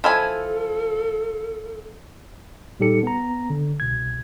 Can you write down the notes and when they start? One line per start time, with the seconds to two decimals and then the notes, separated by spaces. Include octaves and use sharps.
0.04 F3 E4 A4 G#5
2.79 A#2 G3 D#4 G4 A4 C#7
3.03 B3 A#5
3.50 D3
3.80 C2 B2 G#6